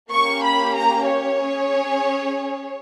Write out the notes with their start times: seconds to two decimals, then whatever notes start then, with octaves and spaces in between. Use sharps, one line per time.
0.12 A#3 C#4 G4 C#6
0.44 B5
0.76 A#5
1.07 C#5
1.39 C#4 G#4